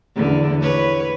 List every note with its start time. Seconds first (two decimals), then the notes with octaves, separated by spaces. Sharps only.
0.15 E2 D3
0.61 B4 C#5